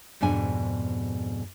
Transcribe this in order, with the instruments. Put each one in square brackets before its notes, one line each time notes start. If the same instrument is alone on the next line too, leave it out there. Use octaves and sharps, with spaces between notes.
[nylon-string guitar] F2 G#2 B2 D4 G#5